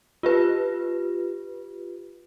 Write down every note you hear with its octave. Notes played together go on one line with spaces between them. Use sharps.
F4 G4 B4